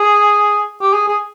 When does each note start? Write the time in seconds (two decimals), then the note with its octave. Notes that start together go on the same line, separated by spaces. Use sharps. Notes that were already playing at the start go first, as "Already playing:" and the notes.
Already playing: G#4
0.82 G4
0.94 G#4
1.08 G#4